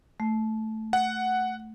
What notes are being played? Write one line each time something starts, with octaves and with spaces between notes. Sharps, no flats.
A3
F#5